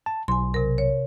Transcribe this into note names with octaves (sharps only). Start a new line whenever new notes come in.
A5
B1 G#5 C6
C3 A#4
C#5